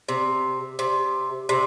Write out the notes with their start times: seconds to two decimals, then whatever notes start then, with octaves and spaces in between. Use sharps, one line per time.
0.09 C3
0.79 C3
1.49 C3